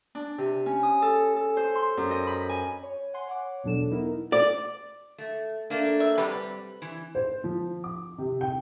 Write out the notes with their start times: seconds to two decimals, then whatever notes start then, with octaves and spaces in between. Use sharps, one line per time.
0.15 D4
0.38 C3
0.66 C#4
0.83 D#6
1.02 A4
1.36 A4
1.57 C5
1.75 C6
1.97 F#2
2.11 D#5
2.27 B5
2.49 G#5
2.83 C#5
3.14 F#5 G#5 C6
3.27 C#5 F#5 D6
3.64 E2 B2 F#3 D4 A4 E7
3.90 B3 D#4 E4 A#4
4.32 D5
5.18 A3
5.70 A3 A#3 D4
6.00 E5
6.18 C3 G3 B4
6.82 E3
7.15 C5
7.44 F3
7.84 D6
8.18 C3
8.41 G5